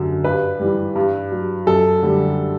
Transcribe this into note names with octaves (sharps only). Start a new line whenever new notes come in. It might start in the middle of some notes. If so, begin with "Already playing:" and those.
Already playing: F#2 D3 F#3
G2 B4
E3 G3
G2
F#3
F#2 A4
D3 G3